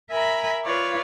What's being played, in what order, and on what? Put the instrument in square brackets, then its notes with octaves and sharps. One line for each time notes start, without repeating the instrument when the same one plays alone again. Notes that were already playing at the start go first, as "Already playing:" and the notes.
[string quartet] A#4 E5 G#5 A#5 B5
F4 B4 C#5 D5 F5